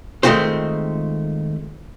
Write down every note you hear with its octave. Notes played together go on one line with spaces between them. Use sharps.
D#3 G#3 A3 C4 F4 C5